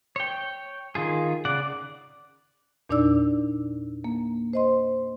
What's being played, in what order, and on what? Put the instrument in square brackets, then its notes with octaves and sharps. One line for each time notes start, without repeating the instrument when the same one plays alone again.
[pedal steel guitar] C#5 G5
D#3 F4 G#4
C#3 D5 F#5
[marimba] E2 A#2 D4 D#4 D5 E6
A#3
C5 D#5 C6